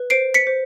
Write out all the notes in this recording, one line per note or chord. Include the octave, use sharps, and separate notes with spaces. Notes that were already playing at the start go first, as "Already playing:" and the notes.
Already playing: B4
C5 C7 D7
B6 C#7
C5